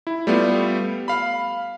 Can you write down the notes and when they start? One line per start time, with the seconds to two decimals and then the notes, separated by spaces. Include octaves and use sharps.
0.07 E4
0.27 G3 A3 B3 F4
1.08 F5 B5